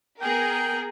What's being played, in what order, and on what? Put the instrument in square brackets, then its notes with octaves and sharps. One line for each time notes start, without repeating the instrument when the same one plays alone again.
[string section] B3 G#4 A#4 [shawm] G5